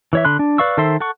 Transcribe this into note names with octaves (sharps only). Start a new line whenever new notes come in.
E3 C#5 E5
D3 B5 C6 F#6
D4
B4 D5 F5 C#6 E6
D#3 A4 C5 E5 C6
A4 F#5 C#6